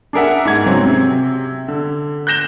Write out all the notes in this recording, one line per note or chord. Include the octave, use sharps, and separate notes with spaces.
D4 G#4 A#4 E5 F#5
G#2 G#6
C#3 F#3 C4
C3
D3
F#6 G6 A#6 E7 G7